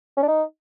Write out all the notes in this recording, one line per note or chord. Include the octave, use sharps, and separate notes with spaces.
C#4
D4
D#4